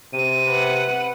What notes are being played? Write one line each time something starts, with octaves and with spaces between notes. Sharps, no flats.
C3 D#7
B4 F#5